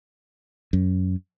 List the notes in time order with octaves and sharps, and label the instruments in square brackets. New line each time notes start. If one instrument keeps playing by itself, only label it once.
[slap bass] F#2